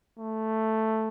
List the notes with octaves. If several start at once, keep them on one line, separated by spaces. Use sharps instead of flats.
A3